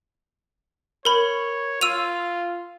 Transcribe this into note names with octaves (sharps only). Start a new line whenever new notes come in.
A#4 C#5 B5
F4 E6 D#7 F7